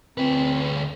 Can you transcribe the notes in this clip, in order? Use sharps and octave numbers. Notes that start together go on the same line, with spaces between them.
D2 C4 B4